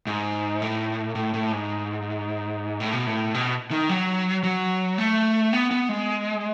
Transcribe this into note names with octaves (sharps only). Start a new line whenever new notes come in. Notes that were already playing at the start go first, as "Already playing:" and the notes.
G#2
A2
A2
A2
G#2
A2
B2
A2
B2
D#3
F#3
F#3
A3
B3
B3
G#3